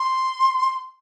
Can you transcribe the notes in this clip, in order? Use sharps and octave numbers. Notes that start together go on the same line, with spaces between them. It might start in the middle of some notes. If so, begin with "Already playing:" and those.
Already playing: C6